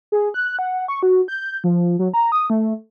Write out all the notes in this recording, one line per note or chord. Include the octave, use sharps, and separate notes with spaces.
G#4
F#6
F#5
C#6
F#4
G6
F3
F#3
A#5
D#6
A3